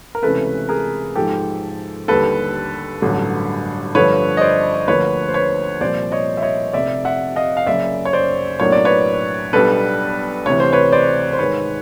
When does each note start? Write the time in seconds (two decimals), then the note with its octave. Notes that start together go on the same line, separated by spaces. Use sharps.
0.15 A#4
0.22 C#2 C3 E3 A3 C#4 A4 B4
0.69 G#4 A#4
1.16 G#2 F3 G#3 G4 A4
2.08 D#2 D3 G3 A4 B4
3.02 A1 G2 D3 F#3
3.95 G2 D3 F3 A3 B4 C#5
4.37 D#5
4.41 C5 D5
4.87 D2 D3 F3 A#3 B4 C#5
5.29 C5
5.34 B4 C#5
5.81 C2 A#2 F3 C5 D5
6.12 C#5 D#5
6.37 E5
6.42 C#5 D#5
6.73 F1 F2 C3 D5 E5
7.05 E5 F#5
7.36 D#5 F5
7.57 F5
7.66 F#1 F#2 C#3 D5 E5
8.05 C#5
8.13 C5 D5
8.60 B1 A2 F#3 A#3 D4 C#5
8.72 D5
8.85 B4 C#5
9.53 B1 B2 G3 B3 D4 A4 B4
10.46 D2 C3 E3 C#5
10.60 C5
10.73 B4 C#5
10.92 C5 D5
11.33 C5
11.39 G#2 D#3 G#3 B4 C#5